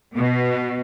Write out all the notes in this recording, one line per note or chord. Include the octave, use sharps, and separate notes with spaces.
B2